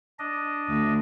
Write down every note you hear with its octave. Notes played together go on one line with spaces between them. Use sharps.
D4 D#5
D2